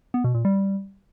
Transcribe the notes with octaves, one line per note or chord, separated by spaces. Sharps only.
B3
B2
A#2
G3